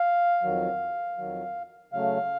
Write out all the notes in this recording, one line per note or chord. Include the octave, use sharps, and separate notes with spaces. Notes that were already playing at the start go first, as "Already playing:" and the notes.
Already playing: F5
F2 D#3 F#3
F2 D#3 F#3
C#3 F#3 A3 F5